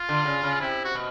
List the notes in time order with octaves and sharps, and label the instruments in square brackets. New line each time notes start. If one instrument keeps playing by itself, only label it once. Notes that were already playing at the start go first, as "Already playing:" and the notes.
Already playing: [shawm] F4
[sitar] D3
C#3
C#3
[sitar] C3 [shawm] E4
[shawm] F#4
[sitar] B2